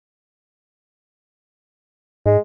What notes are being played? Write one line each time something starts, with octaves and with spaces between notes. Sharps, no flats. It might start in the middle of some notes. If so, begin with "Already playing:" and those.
G#2 G#3